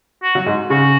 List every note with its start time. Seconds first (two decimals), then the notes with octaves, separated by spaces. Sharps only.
0.23 F#4
0.35 F#3
0.46 G#2
0.70 C#3 F#4